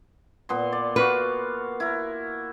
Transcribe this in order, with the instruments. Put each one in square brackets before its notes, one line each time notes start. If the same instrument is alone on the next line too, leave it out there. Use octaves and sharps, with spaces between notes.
[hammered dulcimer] A#2 B3 C6
D5
[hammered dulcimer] F#4 F5 [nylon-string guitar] B4
[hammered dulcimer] E4 A#4